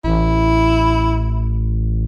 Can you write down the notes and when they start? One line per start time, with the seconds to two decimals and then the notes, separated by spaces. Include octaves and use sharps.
0.04 A1 E4